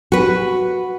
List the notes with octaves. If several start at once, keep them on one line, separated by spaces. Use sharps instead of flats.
F#4 B4